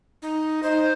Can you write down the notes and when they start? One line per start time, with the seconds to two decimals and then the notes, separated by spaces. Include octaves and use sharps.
0.22 D#4
0.63 D#4 C5